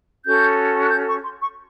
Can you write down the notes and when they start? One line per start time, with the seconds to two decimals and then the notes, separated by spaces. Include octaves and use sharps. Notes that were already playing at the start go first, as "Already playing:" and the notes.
0.25 C#4 F#4 A4 G6
0.82 F#6
0.91 G6
1.08 C#6
1.24 C6
1.40 C#6